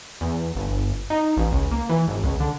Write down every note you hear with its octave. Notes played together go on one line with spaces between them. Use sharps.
E2
G1
D#4
A1
C#2
A#3
E3
G#1
C#2
D3